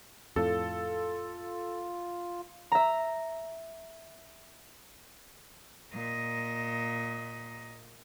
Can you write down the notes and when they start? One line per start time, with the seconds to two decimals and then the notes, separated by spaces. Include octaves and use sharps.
0.36 F2 A2 F4 A4
2.72 E5 A#5
5.94 A#2 D#5